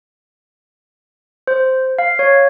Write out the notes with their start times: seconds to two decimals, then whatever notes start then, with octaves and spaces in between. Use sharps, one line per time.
1.47 C5
1.99 F5
2.19 C#5